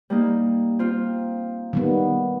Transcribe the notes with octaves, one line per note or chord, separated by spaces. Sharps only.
G3 A#3 D#4
C4 F4
D#3 G3 B3